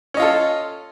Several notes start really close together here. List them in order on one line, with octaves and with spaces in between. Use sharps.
C#4 D#5 F4 A4